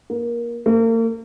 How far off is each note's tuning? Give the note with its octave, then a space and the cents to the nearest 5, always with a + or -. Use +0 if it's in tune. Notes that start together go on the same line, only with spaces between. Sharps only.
A#3 +20
A#3 -40